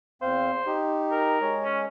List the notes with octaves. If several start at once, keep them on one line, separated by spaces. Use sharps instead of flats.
E2 C4 C5 F5
D#4 G4
A#4
G#3 C#5
C#4